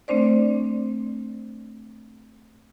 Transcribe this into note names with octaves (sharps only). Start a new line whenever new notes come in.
A3 C4 D4 C5 D5